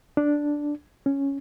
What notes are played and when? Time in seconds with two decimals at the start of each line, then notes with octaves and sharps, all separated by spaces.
0.17 D4
1.06 C#4